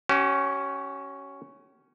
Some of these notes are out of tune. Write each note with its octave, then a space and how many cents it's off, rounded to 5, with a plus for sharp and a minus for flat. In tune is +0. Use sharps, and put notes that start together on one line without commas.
C#4 +0 G4 -45